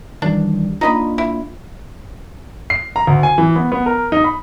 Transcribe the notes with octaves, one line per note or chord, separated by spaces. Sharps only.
D#3 E3 G3 D4
A#3 D4 D#4 F4 D#5 B5
E4
C7
A#5
D2
G#5
E3
B3
B3
A#4
D#4
B5